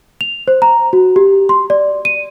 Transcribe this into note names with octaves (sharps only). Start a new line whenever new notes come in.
F7
C5
A#5
F#4
G4
C6
D5
D#7